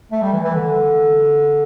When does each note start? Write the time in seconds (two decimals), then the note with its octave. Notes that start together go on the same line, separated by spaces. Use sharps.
0.11 A3
0.22 G3
0.33 E3
0.44 E3
0.55 D3